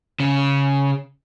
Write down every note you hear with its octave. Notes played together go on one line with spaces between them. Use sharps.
C#3